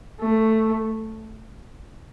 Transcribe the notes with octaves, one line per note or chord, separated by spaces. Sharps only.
A3